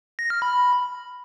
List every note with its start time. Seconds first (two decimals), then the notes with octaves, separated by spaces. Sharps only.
0.19 A#6
0.30 F6
0.42 B5